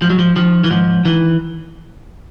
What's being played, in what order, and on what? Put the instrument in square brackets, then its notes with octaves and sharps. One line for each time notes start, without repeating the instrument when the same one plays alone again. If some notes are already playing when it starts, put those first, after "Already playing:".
[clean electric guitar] G#2 F3
F#3
F3
D#3 F3
E3
G#2 F3
D#3 E3